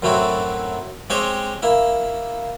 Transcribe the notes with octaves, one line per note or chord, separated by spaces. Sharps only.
F#2 A2 F#3 C4 E4 F#4
G#3 C4 G4 C5 C#5 D#5
A#3 E4